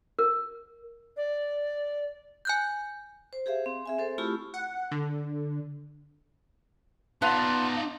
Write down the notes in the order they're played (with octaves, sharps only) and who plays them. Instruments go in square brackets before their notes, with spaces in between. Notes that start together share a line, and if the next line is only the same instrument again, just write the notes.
[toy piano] A#4
[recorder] D5
[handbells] G#5 F#6 G6
[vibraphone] C5
G4 G#4 C5 E5 F5
C4
G#4 E5 G#5
C4 A4 C5
A3 E4 F4 G4 B5 C#6
[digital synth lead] F#5
D3
[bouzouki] B3 F5 [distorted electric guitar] D#4 D5 [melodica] F4 A5